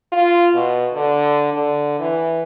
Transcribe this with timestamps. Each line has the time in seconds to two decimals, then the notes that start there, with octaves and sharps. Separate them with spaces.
0.12 F4
0.55 B2
0.94 D3
1.53 D3
1.99 E3